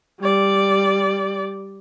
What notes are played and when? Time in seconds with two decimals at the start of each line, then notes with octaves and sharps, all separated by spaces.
0.20 G3 D5